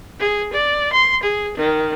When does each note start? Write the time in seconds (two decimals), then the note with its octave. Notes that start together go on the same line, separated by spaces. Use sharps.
0.19 G#4
0.52 D5
0.92 C6
1.24 G#4
1.57 D#3